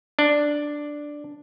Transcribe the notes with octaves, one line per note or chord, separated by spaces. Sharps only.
D4